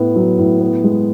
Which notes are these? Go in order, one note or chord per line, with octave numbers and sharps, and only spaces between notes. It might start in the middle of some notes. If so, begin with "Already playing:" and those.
Already playing: A2 B3
F#3
A2
B3
G#3